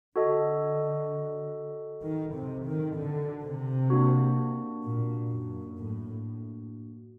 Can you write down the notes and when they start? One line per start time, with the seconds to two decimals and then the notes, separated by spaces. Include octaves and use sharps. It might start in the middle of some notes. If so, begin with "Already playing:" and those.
0.16 D3 F#4 A4 D#5
2.02 D#3
2.34 C3
2.65 D#3
2.96 D3
3.43 C3
3.90 A#3 D4 F#4
4.83 A#2
5.30 F#2
5.77 A2